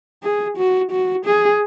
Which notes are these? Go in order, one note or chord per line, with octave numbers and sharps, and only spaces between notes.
G#4
F#4
F#4
G#4